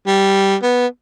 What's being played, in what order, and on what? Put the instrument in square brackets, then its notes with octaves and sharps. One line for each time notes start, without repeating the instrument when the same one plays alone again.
[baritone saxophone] G3
B3